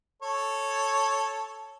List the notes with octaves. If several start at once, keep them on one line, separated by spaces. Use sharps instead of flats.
A4 C#5